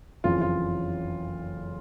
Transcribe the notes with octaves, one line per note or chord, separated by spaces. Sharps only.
F#1 F2 C#3 E3 F4
F4